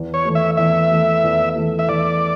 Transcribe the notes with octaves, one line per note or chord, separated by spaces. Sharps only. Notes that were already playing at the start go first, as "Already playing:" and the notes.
Already playing: E2
C#5
E3 A3
E5
E2 E5
E3 A3
E2
E3 A3
E5
E2 D5